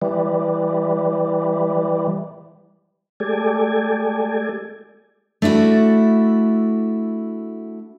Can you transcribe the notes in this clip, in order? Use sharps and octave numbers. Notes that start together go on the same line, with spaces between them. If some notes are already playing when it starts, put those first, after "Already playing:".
E3 G3
G#3 A3 G4 A4 D5 G#5
A3 D4 E4 F#4 A4